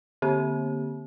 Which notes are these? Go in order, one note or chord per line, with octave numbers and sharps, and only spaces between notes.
D3 A#3 C4 G4